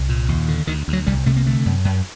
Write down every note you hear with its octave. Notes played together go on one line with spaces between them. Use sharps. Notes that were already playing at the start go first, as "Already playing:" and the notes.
Already playing: C2
A#2
D#2
D3
D2 D#3
D2
F#3
C2 G3
C3 A3
A#3
D3 A3
F#2
F#2